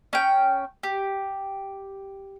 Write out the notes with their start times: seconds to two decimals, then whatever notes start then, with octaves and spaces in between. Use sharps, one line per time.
0.13 C#4 G5
0.83 G4